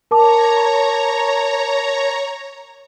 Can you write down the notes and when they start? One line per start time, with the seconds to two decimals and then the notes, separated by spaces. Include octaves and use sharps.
0.11 A#4 C#5 A5 A#5 D6